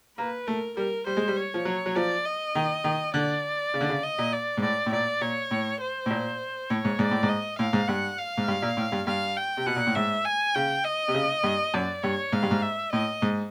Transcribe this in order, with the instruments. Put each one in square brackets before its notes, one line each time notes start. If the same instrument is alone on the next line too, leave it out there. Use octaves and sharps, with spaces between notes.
[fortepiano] A#3 [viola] B4
[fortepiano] A3 [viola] A#4
[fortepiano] G3 [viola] A#4
[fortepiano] G3 [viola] C5
[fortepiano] G#3
G3
[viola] C#5
[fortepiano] F3
F#3
F#3
[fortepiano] F3 [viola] D5
[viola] D#5
[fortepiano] D#3
D#3
[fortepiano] D3 [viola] D5
[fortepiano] C#3
D3
C#3
[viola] D#5
[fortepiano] A#2
[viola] D5
[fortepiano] G#2
[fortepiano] A2 [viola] D5
[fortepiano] A2
[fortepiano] A#2 [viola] D5
[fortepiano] A#2 [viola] C#5
[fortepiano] A2
[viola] C5
[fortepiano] A2
A#2
[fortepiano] A2 [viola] C#5
[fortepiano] G#2
[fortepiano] G#2 [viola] D5
[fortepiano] A2
G#2
[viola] D#5
[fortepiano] A2 [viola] F5
[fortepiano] G#2
[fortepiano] G2 [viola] F#5
[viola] F5
[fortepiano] G#2
G2
A#2
A2
G2
[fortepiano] G2 [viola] F5
[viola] G5
[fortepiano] C3
[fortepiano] B2 [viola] F#5
[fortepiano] A#2
A2
[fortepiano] G#2 [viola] E5
[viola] G#5
[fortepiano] C#3 [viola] G5
[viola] D#5
[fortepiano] C3
C#3
G2
[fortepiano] F#2 [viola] D5
[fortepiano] G2 [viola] C#5
[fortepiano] G#2 [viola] F5
[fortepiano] G2
G#2
[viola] E5
[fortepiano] A2 [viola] D#5
[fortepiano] G#2